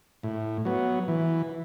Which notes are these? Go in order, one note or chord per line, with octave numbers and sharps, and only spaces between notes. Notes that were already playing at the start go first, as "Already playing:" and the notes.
A2
F#3 B3
E3